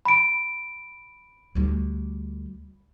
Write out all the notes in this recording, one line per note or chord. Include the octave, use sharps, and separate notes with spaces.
B5 D7
D2 G3